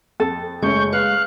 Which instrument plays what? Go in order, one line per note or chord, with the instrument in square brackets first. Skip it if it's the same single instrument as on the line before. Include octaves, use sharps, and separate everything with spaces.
[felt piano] F2 [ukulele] A4
[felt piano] F#1 A3 C#4 [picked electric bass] G#3 [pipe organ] C#6 G6
[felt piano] B4 [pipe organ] F5 F#6